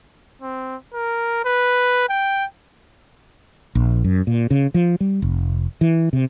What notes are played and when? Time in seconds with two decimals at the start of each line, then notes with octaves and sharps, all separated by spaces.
0.42 C4
0.94 A#4
1.45 B4
2.09 G5
3.75 A#1
4.04 F#2
4.27 A#2
4.51 C#3
4.74 F3
5.00 G3
5.22 F1
5.81 E3
6.13 C3